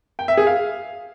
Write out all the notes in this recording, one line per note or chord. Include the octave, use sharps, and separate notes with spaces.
G5
E5
G#4
F5